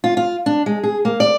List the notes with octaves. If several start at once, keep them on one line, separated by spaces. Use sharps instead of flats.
F4
F4
D4
G#3
G#4
A#3
D5